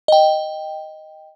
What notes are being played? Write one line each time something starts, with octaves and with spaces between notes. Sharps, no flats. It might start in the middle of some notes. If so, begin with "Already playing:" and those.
D#5 G5